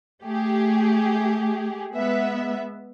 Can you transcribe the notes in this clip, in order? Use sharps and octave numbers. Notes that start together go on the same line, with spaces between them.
A3 G4 G#4
G#3 B3 E5